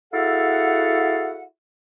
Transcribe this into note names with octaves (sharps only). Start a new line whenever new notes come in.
E4 F#4 G#4 A4 F5 F#5